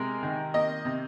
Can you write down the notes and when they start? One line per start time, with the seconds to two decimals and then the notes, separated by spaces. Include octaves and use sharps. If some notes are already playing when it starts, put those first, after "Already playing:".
Already playing: C3 G#3 A#4
0.23 D#3
0.54 A#3 D#5
0.85 C3